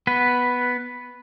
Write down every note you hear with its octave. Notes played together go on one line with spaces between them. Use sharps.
B3 B4